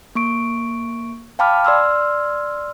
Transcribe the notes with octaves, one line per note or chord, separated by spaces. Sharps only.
A#3 C#6 D7
F5 G5 A5 B5 D6 F6
D5 C6 E6 F6